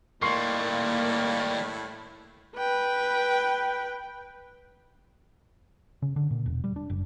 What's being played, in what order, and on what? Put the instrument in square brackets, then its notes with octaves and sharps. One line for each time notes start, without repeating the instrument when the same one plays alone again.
[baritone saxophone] A2 [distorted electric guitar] D#3 G3 [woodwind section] A#3 [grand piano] C6 C#6 C7
[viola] B4 G5
[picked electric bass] C#3
D3
A#2
E1
G3
D4
F#1